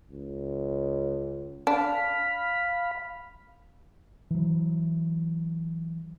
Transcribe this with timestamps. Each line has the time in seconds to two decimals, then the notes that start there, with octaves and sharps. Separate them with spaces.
0.11 C#2
1.67 D4 F5 B5
4.31 E3 F#3